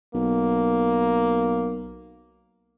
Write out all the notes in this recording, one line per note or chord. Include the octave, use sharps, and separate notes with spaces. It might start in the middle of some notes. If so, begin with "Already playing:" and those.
B1 A#3